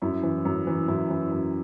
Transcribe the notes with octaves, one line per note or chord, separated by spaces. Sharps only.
F#2 E4
E3
F#2
E3
F#2 E4
E3
F#2